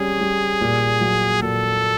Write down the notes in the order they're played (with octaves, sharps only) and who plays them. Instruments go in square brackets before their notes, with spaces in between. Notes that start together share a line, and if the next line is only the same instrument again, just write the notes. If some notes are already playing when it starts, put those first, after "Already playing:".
Already playing: [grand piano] G3 C#4 [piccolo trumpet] G#4
[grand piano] G3
A#2
F#3
[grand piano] A#2 [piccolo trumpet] A4